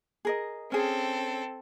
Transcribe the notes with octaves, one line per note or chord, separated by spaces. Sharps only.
G#4 A#4 D#5
C4 C#4 G#4 A4